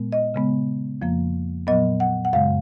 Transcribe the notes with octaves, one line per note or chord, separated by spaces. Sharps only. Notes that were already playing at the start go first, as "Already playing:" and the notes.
Already playing: A#2 G#3 B3
D#5
C#3 G#3 B3
F2 F3 A#3
A#2 F#3 B3 D#5
F#5
F#5
F#2 C#3 G#3 F5